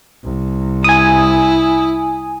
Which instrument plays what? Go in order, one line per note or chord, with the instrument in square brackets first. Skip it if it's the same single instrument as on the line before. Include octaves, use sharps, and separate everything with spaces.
[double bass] C2
[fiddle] E4 [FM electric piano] G#5 D#6